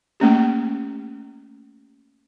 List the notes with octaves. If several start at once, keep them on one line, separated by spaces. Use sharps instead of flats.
A3 A#3 C#4 G4